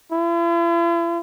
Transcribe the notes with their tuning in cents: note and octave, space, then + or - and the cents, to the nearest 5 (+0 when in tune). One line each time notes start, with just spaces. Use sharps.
E4 +45